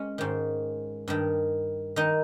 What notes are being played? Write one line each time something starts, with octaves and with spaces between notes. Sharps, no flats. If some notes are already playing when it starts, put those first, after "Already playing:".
Already playing: G#3 C#4
G#2 D#3
G2 D#3
D#3 D#4